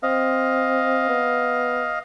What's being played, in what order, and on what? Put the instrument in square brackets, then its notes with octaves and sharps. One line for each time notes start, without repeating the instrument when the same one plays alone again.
[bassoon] C4 [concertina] D#5 F5
[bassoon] B3